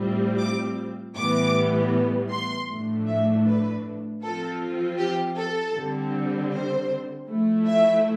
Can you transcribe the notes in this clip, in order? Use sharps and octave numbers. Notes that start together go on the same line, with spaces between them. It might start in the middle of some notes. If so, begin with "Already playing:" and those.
Already playing: A2 G3 C4 F4
D6
A2 E3 G3 B3 D6
C6
A2 F3 A3 D4
E5
B4
F3 C4 F4 A4
G4
A4
D3 G3 C4
C5
F3 A3 E4
E5